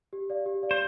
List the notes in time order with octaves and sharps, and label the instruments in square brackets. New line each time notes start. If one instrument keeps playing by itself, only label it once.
[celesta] G4
D5 F5
G4
D5 F5
[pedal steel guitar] C5